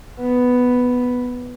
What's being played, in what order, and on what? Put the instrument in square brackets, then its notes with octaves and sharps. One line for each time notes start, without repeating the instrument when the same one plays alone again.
[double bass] B3